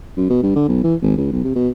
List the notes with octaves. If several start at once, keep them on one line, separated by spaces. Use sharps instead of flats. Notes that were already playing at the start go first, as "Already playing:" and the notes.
F#2
B2
G2
D3
B1
E3
G#1
C#2
B1
C3
B2